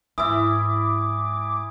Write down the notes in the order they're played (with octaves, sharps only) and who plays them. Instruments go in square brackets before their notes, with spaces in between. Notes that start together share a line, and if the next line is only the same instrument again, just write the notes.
[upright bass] G#2 [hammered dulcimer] E3 E4 [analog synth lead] D6 [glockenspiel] D#6